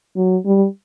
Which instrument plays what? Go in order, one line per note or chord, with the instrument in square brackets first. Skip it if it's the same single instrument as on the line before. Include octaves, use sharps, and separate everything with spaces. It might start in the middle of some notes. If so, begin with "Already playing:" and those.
[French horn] F#3
G3